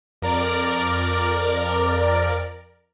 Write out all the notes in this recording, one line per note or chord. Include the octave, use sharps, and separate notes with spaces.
F2 A#4 D5